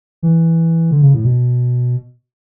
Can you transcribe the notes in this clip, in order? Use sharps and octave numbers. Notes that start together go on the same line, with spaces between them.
E3
D3
C#3
A2
B2